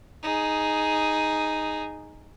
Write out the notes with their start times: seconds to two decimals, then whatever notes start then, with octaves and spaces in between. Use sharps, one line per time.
0.23 D#4 G#4